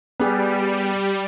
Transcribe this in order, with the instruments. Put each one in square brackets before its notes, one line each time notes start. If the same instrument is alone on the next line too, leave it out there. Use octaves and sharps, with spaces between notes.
[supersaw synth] G3 [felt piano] B3 G#4